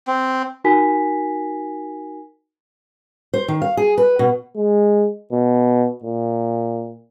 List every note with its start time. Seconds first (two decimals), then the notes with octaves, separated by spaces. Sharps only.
0.07 C4
0.64 D#4 F#4 A#4 G#5 B6
3.34 C5
3.48 D#3
3.62 F5
3.77 G#4
3.98 B4
4.19 B2
4.56 G#3
5.32 B2
6.04 A#2